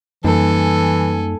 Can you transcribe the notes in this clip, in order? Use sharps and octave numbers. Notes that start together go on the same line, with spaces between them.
F#2 E3 G3 A#3 D#4 A4 G#5